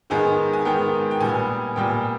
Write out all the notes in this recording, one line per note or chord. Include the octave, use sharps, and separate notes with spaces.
G#2 D#3 G#3 B3 G#5
G#5
G#2 D#3 G#3 B3 G5
G5
A#2 G3 B3 G#5
A#2 G3 B3 G5